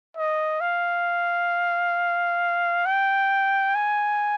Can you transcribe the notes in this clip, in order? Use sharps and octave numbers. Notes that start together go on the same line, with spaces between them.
D#5
F5
G5
G#5